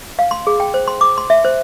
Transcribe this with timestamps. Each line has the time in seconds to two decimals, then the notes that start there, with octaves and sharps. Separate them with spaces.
0.19 F5
0.31 C6
0.47 G#4
0.60 G5
0.74 C5
0.88 C6
1.01 D6
1.18 C6
1.30 E5
1.45 C5